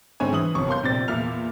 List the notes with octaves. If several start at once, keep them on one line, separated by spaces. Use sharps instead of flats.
G#2 D3 C4 C#5 G#5
E3 D#6 F#7
G1 C3 B3 C#6
A#4 F5 C6 G6
A#1 C3 C4 D5 A6
E2 A#2 E5 F6 F7